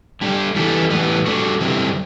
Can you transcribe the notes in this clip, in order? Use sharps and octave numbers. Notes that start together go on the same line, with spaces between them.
D3 G3 D4 G4
E3 G3 B3 E4 A4
A2 E3 G3 B3
G3 D4 F#4 A4
G2 D3 G3 C4 E4